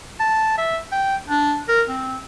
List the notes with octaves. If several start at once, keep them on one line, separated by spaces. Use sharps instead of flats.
A5
E5
G5
D4
A#4
C4